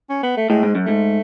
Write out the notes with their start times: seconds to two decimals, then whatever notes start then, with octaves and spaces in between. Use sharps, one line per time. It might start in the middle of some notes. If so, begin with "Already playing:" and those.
0.10 C#4
0.23 B3
0.37 A3
0.50 A2 G#3
0.63 G#2
0.75 F#2
0.86 G#2 A3